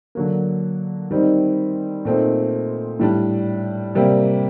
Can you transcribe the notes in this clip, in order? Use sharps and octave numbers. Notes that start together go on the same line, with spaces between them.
D3 F#3 A#3
D#3 G3 C4 D#4
A#2 A3 C4 D#4
A2 G3 D4
C3 G3 A#3